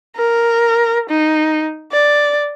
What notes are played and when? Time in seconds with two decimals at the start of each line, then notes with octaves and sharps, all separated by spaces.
0.17 A#4
1.10 D#4
1.92 D5